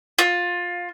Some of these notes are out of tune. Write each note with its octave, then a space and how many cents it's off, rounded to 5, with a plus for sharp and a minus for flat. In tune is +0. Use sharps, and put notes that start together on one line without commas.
F4 +15